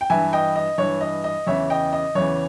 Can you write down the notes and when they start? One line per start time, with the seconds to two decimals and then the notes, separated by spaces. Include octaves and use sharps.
0.01 G5
0.10 G2 E3 E5 G#5
0.33 D#5 G5
0.56 D#5
0.78 G2 E3 C#5
1.01 D#5
1.24 D#5
1.47 E2 C#3 E3 C#5 E5
1.70 D#5 G5
1.93 D#5
2.15 E2 C#3 E3 C#5